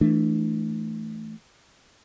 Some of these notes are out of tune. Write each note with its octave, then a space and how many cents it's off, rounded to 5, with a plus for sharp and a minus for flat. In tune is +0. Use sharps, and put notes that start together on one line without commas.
E3 +0 A3 +0 D4 +20